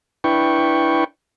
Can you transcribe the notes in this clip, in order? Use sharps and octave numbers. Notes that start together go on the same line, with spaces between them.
D4 E4 B4 G5 C#6